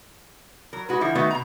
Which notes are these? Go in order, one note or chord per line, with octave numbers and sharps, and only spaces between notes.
F#3 A#4
G#3 F#4 B4
D3 E3 F3 E4
D#3 A3 B3 F#4 B4 F5
B2 A#5